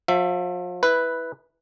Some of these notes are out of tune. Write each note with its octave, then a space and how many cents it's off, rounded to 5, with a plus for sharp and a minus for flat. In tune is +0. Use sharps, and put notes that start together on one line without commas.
F3 +40 E5 +20
E4 -10 B4 +0